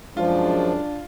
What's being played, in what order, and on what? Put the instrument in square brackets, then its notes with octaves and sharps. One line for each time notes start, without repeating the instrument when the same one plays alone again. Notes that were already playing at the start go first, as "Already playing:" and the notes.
[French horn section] F#2 G#3 [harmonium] F3 [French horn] D4 [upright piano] F4